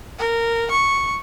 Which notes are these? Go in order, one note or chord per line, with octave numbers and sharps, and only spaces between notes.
A#4
C#6